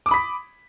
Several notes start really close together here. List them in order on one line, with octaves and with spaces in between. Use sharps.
D6 D#6 B5 B6